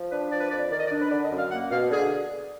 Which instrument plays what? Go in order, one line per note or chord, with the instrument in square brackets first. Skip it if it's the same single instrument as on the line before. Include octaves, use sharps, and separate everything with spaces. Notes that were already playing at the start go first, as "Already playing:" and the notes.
Already playing: [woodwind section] F3
D4 B4
F3 D5
B4
F2 D5
D#3 D5
D#5
D5
D4
B4
D3 D5
D#5
F#2
F5
A#3 F#5
B2 F5
D3 G#4